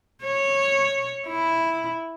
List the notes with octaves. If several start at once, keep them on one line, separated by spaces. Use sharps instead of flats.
C#5
E4